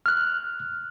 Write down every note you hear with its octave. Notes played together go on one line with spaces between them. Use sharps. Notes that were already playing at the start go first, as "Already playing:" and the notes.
F6 F#6